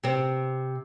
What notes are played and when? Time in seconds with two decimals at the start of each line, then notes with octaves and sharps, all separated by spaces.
0.03 C3 C4